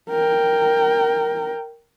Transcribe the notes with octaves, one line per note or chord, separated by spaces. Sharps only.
A#4 G5